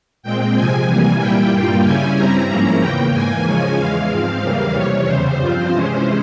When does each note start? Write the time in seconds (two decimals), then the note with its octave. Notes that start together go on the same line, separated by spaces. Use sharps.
0.23 A#2 G#3 C4 G5
0.55 C3 F3 G#3 G#5
0.87 C3 E3 G3 A#3
1.20 A#2 G3 A#3 E4 G5
1.51 G2 G3 A#3 F4
1.84 C#3 G3 C#4 E4 G#5
2.16 G2 G3 C4 E4 A#5
2.48 G#2 F3 A#3 C#4 E4
2.81 E2 C#3 E3 A#3 G5
3.13 G#2 E3 A#3 G#5
3.45 C#3 F3 G#3 C#4
3.77 E2 E3 G#3 F5
4.10 G#2 F3 C4 F5
4.42 E2 C#3 E3 G3 A#3
4.74 F2 C3 E3 G3 C#5
5.07 E2 C#3 G3 C5
5.39 G2 F3 C4 F4
5.71 C3 E3 G#3 C#4